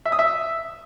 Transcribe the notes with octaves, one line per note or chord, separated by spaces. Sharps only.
E5
D#6
E5